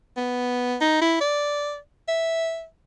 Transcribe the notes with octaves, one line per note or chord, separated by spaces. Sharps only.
B3
D#4
E4
D5
E5